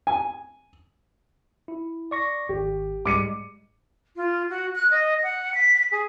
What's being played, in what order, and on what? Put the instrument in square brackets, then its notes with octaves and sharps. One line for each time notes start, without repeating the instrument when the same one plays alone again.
[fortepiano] G#5
[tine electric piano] E4
D5 C#6 A#6
[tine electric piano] G#1 [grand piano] G4
[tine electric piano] G#2 G3 G#3 [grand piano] D6 C#7 D#7
[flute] F4
F#4
F#6
D#5
F#5
B6
G#4